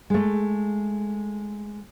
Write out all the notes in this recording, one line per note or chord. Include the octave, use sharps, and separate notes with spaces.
G#3 A3